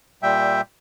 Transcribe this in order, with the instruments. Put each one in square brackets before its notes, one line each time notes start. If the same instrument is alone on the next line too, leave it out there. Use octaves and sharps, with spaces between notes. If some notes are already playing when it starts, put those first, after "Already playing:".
[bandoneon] A#2 G3 E5 G5